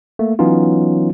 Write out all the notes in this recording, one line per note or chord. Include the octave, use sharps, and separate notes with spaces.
A3 A#3
E3 F#3 B3 C#4 D#4 F4